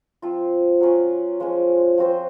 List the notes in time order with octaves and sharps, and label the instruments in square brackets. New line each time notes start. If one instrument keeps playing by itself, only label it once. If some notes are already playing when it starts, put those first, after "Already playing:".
[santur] F3 C4 F4
F#3 C#4 F4
F3 G#3 C#4
F3 C4 F#4 C5